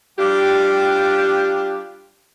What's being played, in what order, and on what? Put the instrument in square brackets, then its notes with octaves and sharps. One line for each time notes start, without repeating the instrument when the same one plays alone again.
[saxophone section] G3 D4 F4 G4